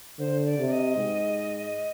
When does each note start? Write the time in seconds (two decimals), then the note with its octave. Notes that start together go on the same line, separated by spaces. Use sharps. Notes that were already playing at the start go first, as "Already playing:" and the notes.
0.19 D3 C5
0.45 D5
0.59 C3
0.66 D5
0.71 D#5
0.96 G#2